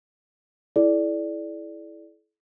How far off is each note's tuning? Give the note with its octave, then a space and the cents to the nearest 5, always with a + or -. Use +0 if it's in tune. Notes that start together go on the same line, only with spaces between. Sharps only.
E4 +0 A4 -45 D5 +0